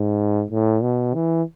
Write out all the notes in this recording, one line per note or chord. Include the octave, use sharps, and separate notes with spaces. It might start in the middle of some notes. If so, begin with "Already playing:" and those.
Already playing: G#2
A2
B2
E3